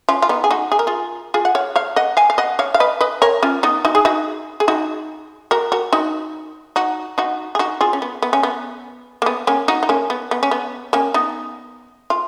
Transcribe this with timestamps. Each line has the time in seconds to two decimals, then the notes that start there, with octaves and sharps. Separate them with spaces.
0.09 C#4 F4
0.22 F4
0.29 B3 D#4
0.44 G#4
0.51 D#4 F#4
0.72 G#4
0.79 A#4
0.87 F4 G#4
1.34 F4 G#4
1.45 F#5
1.55 C#5 F5
1.76 C#5 F5
1.96 D#5 F#5
2.17 F5 G#5
2.30 F5
2.38 D#5 F#5
2.59 C#5 F5
2.74 F5
2.80 B4 D#5
3.01 B4 D#5
3.22 A#4 C#5
3.43 C#4 F4
3.63 B3 D#4
3.85 D#4 F#4
3.95 G#4
4.05 D#4 F#4
4.60 G#4
4.68 D#4 F#4
5.51 F#4 A#4
5.72 F#4 A#4
5.93 D#4 F#4
6.76 D#4 F#4
7.18 D#4 F#4
7.55 G#4
7.59 D#4 F#4
7.81 F4 G#4
7.93 C#4
8.02 B3
8.22 B3
8.33 C#4
8.43 B3
9.22 A#3
9.26 B3
9.47 A#3 C#4
9.68 D#4 F#4
9.83 D#4
9.89 A#3 C#4
10.10 B3
10.31 B3
10.43 C#4
10.51 B3
10.93 A#3 C#4
11.14 B3 D#4
12.10 F4